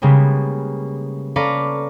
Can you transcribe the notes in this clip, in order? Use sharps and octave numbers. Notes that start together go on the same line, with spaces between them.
C#3 G3 G#3 A#3 B3
C#4 A4 B4 D5 F5 A#5